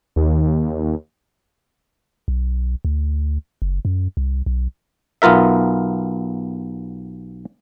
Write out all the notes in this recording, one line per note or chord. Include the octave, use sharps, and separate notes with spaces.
D#2
B1
D2
F#1
F#2
C2
B1
B1 B3 F4 A#4 E5